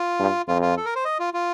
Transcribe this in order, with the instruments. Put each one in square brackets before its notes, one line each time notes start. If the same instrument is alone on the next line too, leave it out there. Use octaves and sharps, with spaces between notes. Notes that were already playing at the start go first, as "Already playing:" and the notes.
Already playing: [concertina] F4
[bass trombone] G2
[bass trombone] F2 [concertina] F4
[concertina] F4
A4
A#4
C5
D#5
F4
F4